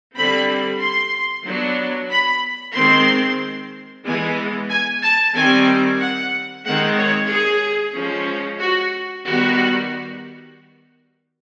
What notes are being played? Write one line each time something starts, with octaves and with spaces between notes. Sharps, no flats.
D3 G3 C4 B5
C6
F#3 B3 D4
B5
D#3 G#3 C4 C6
E3 G#3 B3 G#5
G#5
A5
D#3 G3 C4 G#5
F#5
D#3 G#3 C4 F#5
C#5
G#4
F3 G#3 C#4
F#4
D#3 G3 B3 F#4